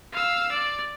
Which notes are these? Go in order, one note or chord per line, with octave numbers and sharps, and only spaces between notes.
F5 E6
D5